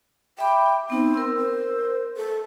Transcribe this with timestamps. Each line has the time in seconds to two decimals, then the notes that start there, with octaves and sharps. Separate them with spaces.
0.39 E5 G5 B5 D6
0.90 B3 C4 D#4
1.14 A#4 E6
1.37 C5
2.17 A4